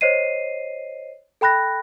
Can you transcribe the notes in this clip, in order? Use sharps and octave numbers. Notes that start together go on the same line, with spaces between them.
C5 C#5 D#5 C7 D#7
A4 G5 B5 F#6 A#6